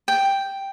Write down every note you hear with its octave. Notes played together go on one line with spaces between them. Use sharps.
G5